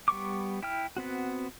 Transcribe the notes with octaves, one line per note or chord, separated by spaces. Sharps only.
G3 B3 C#6 D6
E4 G5 F6
B3 C4 F#4